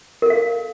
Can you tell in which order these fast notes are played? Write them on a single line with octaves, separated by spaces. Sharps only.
A#4 A4 F5